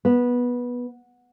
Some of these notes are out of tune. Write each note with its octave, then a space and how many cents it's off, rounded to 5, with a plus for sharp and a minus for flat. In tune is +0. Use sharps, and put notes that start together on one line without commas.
B3 -15